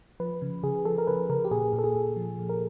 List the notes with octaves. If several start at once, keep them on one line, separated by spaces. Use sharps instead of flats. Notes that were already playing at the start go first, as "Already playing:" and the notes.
F3 B4
C#3
C#3 G#4
F3 A4
A#4
C#3 B4
C#3 A#4
G4
A#2 G#4
A#2
A4
G#4
A#2
F3
A#2
A#4